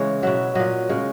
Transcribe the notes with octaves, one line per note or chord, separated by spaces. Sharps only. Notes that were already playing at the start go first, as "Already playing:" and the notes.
Already playing: C#3 E3 G#3 C#5
B2 F#3 E5
A#2 F#3 D#5
C#3 G#3